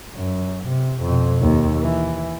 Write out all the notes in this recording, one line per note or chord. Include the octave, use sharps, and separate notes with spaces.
F#2
C3
F2 B2
D#2
E3